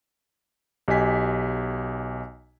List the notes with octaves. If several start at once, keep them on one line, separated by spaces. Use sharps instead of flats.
B1 G4 D#5 G#5 B6